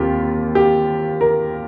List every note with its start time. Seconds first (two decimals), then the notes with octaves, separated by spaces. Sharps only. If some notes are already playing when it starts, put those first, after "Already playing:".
Already playing: D#2 C4 F4 G4
0.55 G4
1.21 A#4